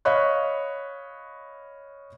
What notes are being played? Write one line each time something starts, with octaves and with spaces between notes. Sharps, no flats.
C#5 D#5 F5 B5 C#6 F#6